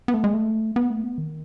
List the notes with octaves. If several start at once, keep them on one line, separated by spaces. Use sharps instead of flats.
B3
A3
G#3
A3
B3
A3
B3
D#3